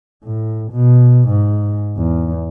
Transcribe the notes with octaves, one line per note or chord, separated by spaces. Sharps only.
A2
B2
G#2
E2